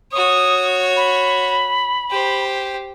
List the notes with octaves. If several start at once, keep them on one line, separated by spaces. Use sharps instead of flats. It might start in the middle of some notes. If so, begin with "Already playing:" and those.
F#4 C#5 D#6
B5
G4 C5